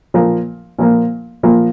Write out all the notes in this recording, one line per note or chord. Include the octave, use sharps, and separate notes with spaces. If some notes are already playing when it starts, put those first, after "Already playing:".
A#2 F3 A#3
A#2 F3 A#3
A#2 F3 A#3